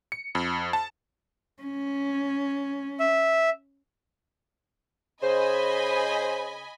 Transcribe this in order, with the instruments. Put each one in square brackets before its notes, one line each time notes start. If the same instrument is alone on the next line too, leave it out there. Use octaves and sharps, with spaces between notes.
[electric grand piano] C#7
F2
A5
[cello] C#4
[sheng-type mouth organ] E5
[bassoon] C#3 [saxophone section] C5 [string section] D#5 G#5 B5